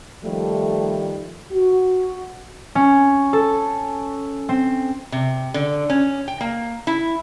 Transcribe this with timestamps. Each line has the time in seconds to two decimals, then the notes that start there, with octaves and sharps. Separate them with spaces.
0.24 D#3 F3 G3 A3
1.52 F#4
2.75 C#4
3.33 A4
4.49 C4
5.12 C3
5.54 D3
5.90 C#4
6.28 G5
6.41 A#3
6.87 E4